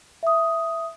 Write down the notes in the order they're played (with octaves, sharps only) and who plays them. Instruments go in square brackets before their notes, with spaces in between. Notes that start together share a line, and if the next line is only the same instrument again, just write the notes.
[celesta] E5 D#6